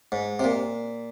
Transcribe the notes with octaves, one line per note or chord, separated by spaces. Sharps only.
G#2
C3
A#2